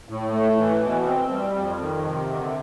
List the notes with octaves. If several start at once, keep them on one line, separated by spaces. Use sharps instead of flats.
A2
A3
E3
B2
C4
G3
F2
D#3
C3
D3